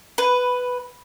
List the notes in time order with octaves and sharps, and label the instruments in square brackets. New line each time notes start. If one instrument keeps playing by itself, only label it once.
[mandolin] B4